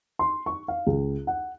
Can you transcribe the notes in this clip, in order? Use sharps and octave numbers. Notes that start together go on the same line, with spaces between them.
C6
C#6
F5
C#2
F#5